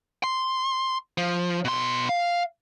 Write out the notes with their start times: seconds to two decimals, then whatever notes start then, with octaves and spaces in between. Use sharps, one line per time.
0.24 C6
1.18 F3
1.65 B2 C6
2.09 F5